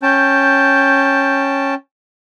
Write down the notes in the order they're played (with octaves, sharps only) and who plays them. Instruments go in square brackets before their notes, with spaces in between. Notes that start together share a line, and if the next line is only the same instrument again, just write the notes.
[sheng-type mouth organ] C#4 G5 A5 [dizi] G6